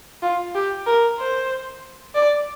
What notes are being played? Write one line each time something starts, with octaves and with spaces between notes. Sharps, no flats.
F4
G4
A#4
C5
D5